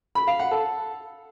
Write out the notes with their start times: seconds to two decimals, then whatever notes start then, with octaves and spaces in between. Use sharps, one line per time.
0.15 B5
0.27 F5
0.39 F#5
0.51 A4